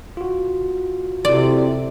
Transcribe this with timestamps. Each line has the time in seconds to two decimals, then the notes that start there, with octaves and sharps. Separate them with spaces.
0.17 F4 F#4
1.25 C3 C4 E4 A4 D5